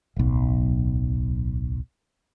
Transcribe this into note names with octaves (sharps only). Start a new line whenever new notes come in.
D1 B1